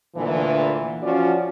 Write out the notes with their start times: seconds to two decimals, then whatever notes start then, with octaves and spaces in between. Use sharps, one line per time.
0.16 D2 A#2 D3 E3
1.03 F3 C#4 F4 F#4 D5